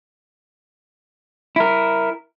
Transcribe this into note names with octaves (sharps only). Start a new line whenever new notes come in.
E4 A#4